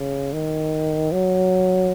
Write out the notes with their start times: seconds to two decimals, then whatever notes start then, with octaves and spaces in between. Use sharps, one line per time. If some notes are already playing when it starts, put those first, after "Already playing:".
Already playing: C#3
0.33 D#3
1.12 F#3